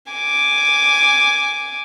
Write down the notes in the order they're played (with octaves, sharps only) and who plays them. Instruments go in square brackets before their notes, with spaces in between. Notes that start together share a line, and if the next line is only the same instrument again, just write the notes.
[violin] G#5 D6